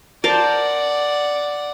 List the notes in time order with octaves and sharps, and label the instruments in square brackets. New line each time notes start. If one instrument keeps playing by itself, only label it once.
[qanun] A#4 C5 A5 [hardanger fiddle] D5 F#5